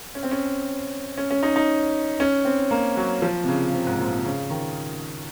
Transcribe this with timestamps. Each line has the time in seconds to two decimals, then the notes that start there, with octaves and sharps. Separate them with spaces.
0.15 C#4
0.23 C4
0.31 C#4
1.18 C#4
1.30 C#4
1.43 D#4
1.56 D#4
2.20 C#4
2.45 C4
2.71 A#3
2.97 F#3
3.22 F3
3.44 C3
3.48 C#3
3.69 C#3
3.73 C3
3.87 G#2
4.00 A#2
4.12 C3
4.25 C#3
4.50 D#3